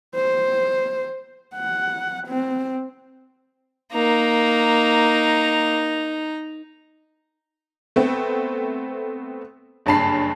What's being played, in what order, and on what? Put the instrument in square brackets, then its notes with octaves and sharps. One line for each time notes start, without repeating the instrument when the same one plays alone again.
[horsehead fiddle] C5
F#5
C4
[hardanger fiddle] A#3 [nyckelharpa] D#4 A#5
[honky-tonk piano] A3 B3 C4
F#1 G2 C#5 A5 B5 C7